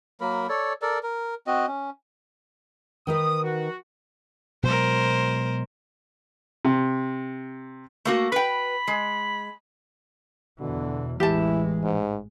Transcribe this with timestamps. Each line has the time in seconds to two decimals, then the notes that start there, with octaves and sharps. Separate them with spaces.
0.21 F#3 A#3 A#4 B5
0.49 A4 C#5 D5
0.82 A4 A#4 D5
1.03 A#4
1.47 C4 F#4 D#5
1.68 C#4
3.07 D#3 D#4 B4 D#6
3.43 F#4
4.63 B2 F#3 G#3 A#4 C5
6.65 C3
8.05 A3 A#3 F#4
8.32 B4 G5 B5
8.88 G#3
10.60 E2 B2 D3 E3
11.20 A1 E3 G#3 E4 G4 A5
11.84 G#2